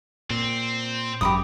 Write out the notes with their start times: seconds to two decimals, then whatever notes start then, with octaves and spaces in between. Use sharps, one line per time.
0.30 A#2 C4
1.21 G#1 F#2 G4 B5 D#6